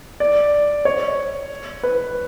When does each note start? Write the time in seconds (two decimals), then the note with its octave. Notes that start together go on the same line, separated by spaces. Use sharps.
0.20 D5
0.85 C#5
1.83 B4